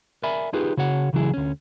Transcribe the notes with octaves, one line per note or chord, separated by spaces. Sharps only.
A#4 D5 E5 G#5 B5
D#4 F4 G4 G#4 B4
C#3 F#4 C#5 F#5
C#2 C#3 E3 F#3 E4 G#4
D2 C#4